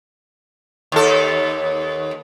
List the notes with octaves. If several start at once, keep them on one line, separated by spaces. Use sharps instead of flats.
D#2 A4